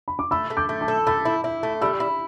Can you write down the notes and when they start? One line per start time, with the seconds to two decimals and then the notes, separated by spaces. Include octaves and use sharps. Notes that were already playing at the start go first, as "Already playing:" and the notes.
0.08 B5
0.19 D6
0.31 A3 B5 E6
0.50 A3
0.57 D6 G6
0.69 A3
0.81 A5 D6
0.88 A4
1.07 A3 B5 E6
1.25 E4
1.44 E4
1.63 A3
1.81 G3 B5 E6
2.00 E4